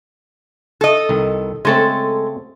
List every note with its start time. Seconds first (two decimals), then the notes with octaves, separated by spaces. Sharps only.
0.81 A4 D#5
1.09 C2 D#3
1.65 C#3 G#3 A3 C4 A4